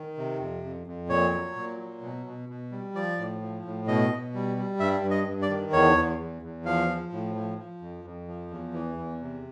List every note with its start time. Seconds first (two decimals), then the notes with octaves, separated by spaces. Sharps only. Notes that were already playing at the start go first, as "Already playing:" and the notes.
Already playing: D#3
0.17 C3
0.40 F2
0.63 F2
0.87 F2
1.09 A#2 C#5
1.33 F#3
1.56 A#2
1.79 F#3
2.02 B2
2.26 B2
2.49 B2
2.71 G3
2.95 F3 D5
3.19 A2
3.41 F3
3.65 A2
3.87 B2 D#5
4.11 B2
4.34 G3
4.57 G3
4.80 G2 E5
5.03 G2
5.11 D#5
5.27 G2
5.42 D5
5.49 D#3
5.73 E2 C#5
5.97 E2
6.19 E2
6.42 E2
6.65 F3 F5
6.89 F3
7.12 A2
7.35 F3
7.58 F3
7.82 F2
8.04 F2
8.28 F3
8.51 E2
8.73 E3
8.98 E2
9.21 C3